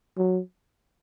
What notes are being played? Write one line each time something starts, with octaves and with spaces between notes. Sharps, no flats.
F#3